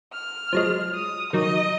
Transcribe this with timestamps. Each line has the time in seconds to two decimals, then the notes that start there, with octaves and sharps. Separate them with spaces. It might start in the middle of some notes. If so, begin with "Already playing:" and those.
0.14 F6
0.53 F3 F#3 G#3
0.95 D#6
1.33 D#3 F#3 D#5